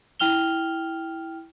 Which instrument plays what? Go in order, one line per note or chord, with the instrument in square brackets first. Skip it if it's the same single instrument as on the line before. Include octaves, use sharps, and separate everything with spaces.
[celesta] E4 G5 F6 F7 G7